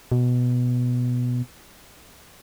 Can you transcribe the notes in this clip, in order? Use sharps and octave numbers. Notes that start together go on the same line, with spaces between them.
B2